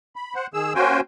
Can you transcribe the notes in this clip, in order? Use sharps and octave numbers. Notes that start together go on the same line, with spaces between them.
B5
C5 F#5
D#3 G#4 E6
A#3 C#4 F#4 C5 G5 G#5